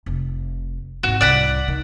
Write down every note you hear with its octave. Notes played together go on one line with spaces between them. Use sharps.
F1
G#1 F2 F#4
C2 D5 F#5 B5
D#3